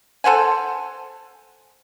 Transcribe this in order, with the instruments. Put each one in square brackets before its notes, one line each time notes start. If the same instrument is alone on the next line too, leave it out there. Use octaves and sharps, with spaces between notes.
[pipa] A4 C5 F#5 G#5